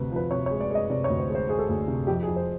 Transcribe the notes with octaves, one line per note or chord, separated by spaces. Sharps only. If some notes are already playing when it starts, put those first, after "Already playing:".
Already playing: D2 C3 B4
F3 B4
C3 C#5
C#5
G#3
D5
G#3 D#5
C3 D5
C#5
D2
C5
G#3
C5
G#3 G#4
A4
D2 G#4
C3
F2 G4
G#4
F2
C5